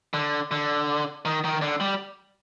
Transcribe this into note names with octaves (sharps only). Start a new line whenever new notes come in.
D3
D3
D#3
D#3
D3
G3